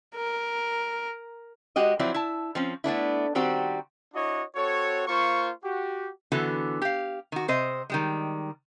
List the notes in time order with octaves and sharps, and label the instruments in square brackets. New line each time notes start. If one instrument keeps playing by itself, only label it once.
[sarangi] A#4
[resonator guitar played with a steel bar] G#3 F#4 G4 D#5
F3 F#3 C4 E4 D5
E4 A5
F3 C4 C#4
A3 B3 D4 E4
D#3 G3 C4 F#4 G4 C5
[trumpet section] D4 E4 F#4 C#5 D#5
C4 F#4 A4 C#5
A#3 F4 C5 C#6
F#4 G4
[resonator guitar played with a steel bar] D3 E3 B3 F#4 A4
G4 F5
D#3 F#4
C3 C5 D#5
D#3 G3 G#3